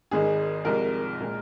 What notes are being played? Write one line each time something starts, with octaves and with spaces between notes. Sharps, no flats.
G#1 G#2 D#3 G#3 G#4
C2 C3 F3 G#3 A#4
A#2 G#3